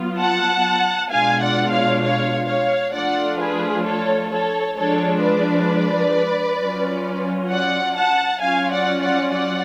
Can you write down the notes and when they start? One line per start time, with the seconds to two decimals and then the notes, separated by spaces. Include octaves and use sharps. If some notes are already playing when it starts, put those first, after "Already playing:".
Already playing: F#3 B3 F4
0.20 F#5 A5
1.11 B2 G#3 D4 F4 F5 G#5
1.41 D5 F#5
1.71 C#5 F5
2.02 C#5 F5
2.48 C#5 F5
2.93 F3 A3 D4 F4 D5 F#5
3.39 G#4 B4
3.85 A4 C#5
4.31 A4 C#5
4.76 F3 G#3 D4 F4 A4 C#5
5.21 B4 D5
6.59 F#3 C#4 F4
7.50 D5 F#5
7.96 F#5 A5
8.41 F#3 C#4 F4 F5 G#5
8.72 D5 F#5
9.02 D5 F#5
9.33 D5 F#5